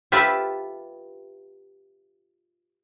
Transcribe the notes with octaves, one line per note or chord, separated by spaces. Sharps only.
F4 G4 B4 E5 A5